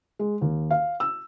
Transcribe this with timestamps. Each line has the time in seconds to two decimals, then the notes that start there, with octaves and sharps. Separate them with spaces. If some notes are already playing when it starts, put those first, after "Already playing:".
0.19 G#3
0.41 D#2
0.71 F5
1.00 E6